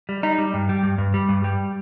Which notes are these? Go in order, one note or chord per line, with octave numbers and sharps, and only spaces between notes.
G3
G3 D#4
G3
G2
G3
G2
G2
G3
G2
G3